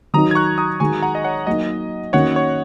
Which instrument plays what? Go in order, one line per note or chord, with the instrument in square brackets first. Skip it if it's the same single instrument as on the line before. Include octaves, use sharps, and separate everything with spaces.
[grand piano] D#3 F#3 D#4 F#4 [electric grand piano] A#5 D#6
[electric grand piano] G#6
C#6 F#6
A#5 D#6
[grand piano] D#3 G#3 F#4 [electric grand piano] G#5 C#6
[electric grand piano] F#5 A#5
D#5
C#5 F#5
[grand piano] F#3 A#3 D#4 [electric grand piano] D#5
[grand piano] D#3 A#3 C#4 F#4 [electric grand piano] C#5 F#5
[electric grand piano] C#5